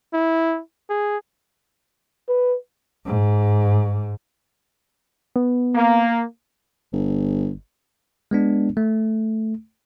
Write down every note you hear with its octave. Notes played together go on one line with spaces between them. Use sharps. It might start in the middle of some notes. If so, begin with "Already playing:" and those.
E4
G#4
B4
G#2
B3
A#3
G1
G#3 B3 D4
A3